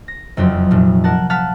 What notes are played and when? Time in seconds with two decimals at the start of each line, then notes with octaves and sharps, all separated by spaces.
0.08 A#6
0.37 F#1 F2 F#3 C4
0.71 F1 A#2
1.04 A#4 F#5 A5
1.30 F5 F#5 A5 F6 A6 B6